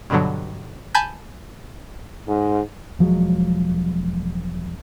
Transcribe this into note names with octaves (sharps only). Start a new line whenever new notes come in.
G2 B2 D3 F#3
G#5 A5 B5 G6
G#2
E1 F3 F#3 G#3